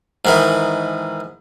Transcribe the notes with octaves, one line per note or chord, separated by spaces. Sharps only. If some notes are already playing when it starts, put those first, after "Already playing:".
G#2 D#3 E3